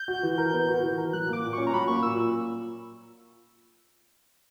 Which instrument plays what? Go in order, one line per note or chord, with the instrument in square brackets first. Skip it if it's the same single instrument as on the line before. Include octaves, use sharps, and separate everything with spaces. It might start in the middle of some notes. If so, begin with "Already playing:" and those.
Already playing: [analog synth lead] G6
[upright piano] F#4
E3
A#4
B3
F#4
E3
A#4
[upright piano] F#3 [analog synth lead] F#6
[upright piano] A#3 [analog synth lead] D6
[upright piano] A#2
[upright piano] C#4 [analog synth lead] C#6
[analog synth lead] A#5
[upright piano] F#3 [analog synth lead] B5
[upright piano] A#3 [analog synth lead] C#6
[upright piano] A#2 [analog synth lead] E6